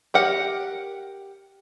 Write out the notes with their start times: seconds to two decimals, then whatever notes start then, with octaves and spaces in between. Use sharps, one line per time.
0.14 G4 A#4 F#5